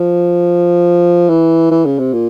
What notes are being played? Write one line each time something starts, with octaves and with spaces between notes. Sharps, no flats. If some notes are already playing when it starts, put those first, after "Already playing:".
Already playing: F3
E3
E3
C#3
C3
A#2